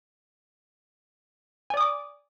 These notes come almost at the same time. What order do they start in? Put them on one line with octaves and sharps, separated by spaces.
G#5 D5 D#6 D6